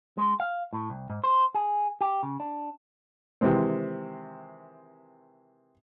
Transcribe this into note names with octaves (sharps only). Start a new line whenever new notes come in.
G#3
F5
A2
C2
G#2
C5
G#4
G4
C#3
D4
C3 D#3 E3 G#3 C4